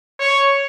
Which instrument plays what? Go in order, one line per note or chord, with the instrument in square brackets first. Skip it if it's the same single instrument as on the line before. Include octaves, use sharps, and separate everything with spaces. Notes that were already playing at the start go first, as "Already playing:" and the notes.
[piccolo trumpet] C#5